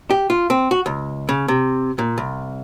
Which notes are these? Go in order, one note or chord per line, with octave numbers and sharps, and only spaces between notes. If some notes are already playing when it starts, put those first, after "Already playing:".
G4
F4
C4
F#4
C#2
C#3
C3
A#2
C2